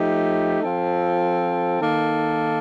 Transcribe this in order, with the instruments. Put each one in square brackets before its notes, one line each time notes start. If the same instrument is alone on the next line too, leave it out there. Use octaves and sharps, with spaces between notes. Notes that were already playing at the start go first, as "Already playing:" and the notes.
Already playing: [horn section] F3 A3 D#4 G4
F3 C4 F4 A4
D#3 A#3 D#4 A4